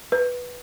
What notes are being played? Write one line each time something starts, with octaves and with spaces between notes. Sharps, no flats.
B4